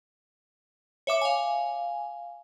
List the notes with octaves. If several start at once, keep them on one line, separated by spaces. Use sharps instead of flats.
C#5 E5 D6
F5 G#5